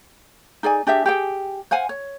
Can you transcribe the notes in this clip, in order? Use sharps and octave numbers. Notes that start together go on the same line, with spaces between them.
D#4 G#4 D5 G#5
D4 G4 G#4 E5
G4 G#4 G5
C5 F5 F#5 G#5
C#5